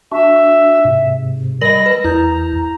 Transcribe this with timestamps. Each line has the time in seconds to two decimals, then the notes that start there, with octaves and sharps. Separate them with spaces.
0.12 D4 F#4 E5
0.85 G#2 C3
1.61 G3 A#4 D#5 B5 A#6
1.86 B4
2.04 E2 E4 A#5 G6